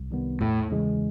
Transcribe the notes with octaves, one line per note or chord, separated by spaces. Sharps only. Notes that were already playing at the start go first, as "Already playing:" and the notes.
Already playing: C2
C3 D#3 G3 B3
E2 A2
C#3 E3 G#3